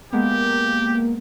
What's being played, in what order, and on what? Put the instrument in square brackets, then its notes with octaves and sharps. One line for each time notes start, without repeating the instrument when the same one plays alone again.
[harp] G#3 B3 [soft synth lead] A#3 [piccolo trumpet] G4